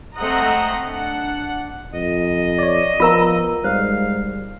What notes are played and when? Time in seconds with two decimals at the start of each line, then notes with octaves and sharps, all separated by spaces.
0.16 A3 C4 D#5 F#5 A#5
0.85 D4 F#5
1.94 F2 D#5
2.59 C#5 D5
3.00 F3 B3 F4 A#4 A#5 E6
3.64 G#2 G3 C5 F5